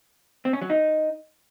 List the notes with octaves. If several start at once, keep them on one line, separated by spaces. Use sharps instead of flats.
C4
C#4
F#3
D#4